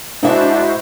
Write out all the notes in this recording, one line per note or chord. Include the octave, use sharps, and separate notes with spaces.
G#2 D4 E4 F#4 C5 E5